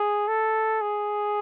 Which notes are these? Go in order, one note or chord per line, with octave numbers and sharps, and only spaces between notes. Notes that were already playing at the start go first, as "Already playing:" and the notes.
Already playing: G#4
A4
G#4